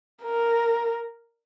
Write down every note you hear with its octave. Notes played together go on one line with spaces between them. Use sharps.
A#4